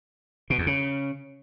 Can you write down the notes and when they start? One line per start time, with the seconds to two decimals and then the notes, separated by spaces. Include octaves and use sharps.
0.50 B2
0.58 E2
0.67 C#3